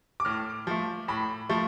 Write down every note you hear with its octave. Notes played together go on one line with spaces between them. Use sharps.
D6
A2 F6
F3 A3
A2 B5
F3 A3